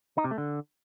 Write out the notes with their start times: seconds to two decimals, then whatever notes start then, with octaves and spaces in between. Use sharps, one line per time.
0.18 D#4
0.24 C3
0.31 A3
0.38 D3